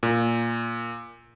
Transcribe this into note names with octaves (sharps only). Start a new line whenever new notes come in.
A#2